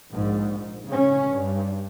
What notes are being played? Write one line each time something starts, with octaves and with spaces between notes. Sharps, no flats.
A#1 G#2
C#3 C#4
G2